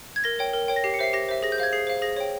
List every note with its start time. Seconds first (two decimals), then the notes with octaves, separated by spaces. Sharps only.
0.16 G#6
0.24 A#4 A#6
0.39 C#5 G5
0.53 A#4
0.68 C#5 G5
0.76 A#6
0.84 G4 C7
0.94 C#7
0.99 C5 E5 C7
1.13 G4 A#6
1.29 C5 E5
1.43 G#4 A#6
1.52 G6
1.58 C5 F5 G#6
1.73 G#4 C7
1.87 C5 F5
2.02 G#4 A#6
2.16 C#5 G5